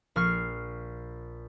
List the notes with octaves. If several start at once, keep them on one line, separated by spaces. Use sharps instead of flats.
A#1 C#6 F6 C7